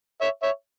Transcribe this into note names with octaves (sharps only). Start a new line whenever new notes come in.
C#5 E5
C#5 E5